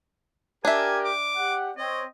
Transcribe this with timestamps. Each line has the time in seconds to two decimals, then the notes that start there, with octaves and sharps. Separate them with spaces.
0.65 D4 G4 A#4 E5 G#5
1.05 D6
1.37 G4 F#5
1.77 C4 C#5 D#5